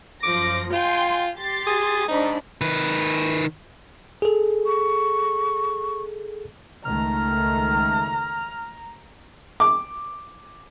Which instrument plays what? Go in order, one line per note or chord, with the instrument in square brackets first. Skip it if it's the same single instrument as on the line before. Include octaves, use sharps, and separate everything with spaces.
[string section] F#2 F3 A#6 [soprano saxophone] D6
[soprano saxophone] F4 [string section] G5 G#5 C6
[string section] G4 C6 A6
[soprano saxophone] G#4
[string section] G#2 D4 B5 [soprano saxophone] D#4
[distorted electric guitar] D#3 B4
[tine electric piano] G#4 A4
[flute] C#6
[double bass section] C#2 D#3 A3 [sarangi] A#5 [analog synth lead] F6
[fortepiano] D6